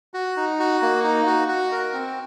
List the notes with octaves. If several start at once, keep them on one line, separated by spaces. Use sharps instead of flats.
F#4
D#4
F#4
A#3
D#4
F#4
F#4
A#4
C4